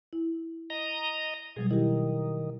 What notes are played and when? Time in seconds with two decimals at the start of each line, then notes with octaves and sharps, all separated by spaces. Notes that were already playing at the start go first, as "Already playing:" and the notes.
0.13 E4
0.70 D#5 A#5
1.56 B2 F#3 G3 G#4
1.71 D#3 E4 G4